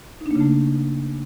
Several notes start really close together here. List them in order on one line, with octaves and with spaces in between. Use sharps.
D#4 D4 A#3 C#3 A3